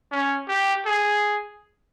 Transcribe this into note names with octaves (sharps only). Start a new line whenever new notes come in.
C#4
G4
G#4